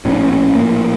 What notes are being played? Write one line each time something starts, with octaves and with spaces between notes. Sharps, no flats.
A#1 A2 C#4
D4
C#4
C#4
A#1 A2 A#3